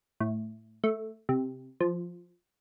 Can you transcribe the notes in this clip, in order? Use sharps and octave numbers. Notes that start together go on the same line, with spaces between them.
A2
A3
C3
F3